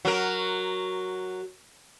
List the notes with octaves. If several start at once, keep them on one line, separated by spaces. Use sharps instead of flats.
F#3 A#4